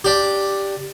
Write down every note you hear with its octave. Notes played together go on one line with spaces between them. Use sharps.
D4 G4